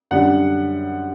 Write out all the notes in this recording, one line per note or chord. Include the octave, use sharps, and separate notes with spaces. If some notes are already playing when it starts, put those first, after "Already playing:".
F#2 D3 G3 F#5